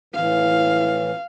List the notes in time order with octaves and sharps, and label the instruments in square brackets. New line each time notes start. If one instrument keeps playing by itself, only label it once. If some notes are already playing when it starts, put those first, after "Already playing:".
[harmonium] A2 E3 [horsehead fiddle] F5